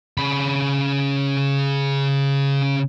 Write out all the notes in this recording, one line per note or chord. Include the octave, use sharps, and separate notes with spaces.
C#3 B5